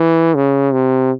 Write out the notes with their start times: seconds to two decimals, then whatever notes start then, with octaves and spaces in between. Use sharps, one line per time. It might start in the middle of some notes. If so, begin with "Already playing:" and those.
Already playing: E3
0.35 C#3
0.73 C3